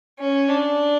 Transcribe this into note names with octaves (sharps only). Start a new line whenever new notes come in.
C#4
D4